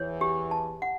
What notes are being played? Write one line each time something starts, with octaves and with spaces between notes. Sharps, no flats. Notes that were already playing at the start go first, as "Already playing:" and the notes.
Already playing: E2 E3 C#5
G4
A5
F#5